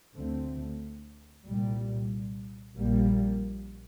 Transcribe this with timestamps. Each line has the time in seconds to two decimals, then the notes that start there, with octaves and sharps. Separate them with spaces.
0.15 D2 D3 A3 C4
1.46 C2 A#2 G3
2.78 A#1 A#2 G3 A#3